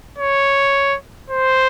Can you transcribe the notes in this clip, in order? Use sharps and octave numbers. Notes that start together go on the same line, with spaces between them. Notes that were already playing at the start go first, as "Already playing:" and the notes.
C#5
C5